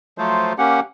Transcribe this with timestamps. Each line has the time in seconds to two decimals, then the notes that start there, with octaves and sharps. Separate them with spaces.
0.18 F3 F#3 A3 F4 C5
0.58 A#3 C#4 G4 F#5